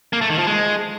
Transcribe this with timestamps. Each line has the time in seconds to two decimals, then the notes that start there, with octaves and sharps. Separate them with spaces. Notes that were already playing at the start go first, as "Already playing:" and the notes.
0.13 A#3
0.21 A3
0.30 D#3
0.38 F3
0.47 G#3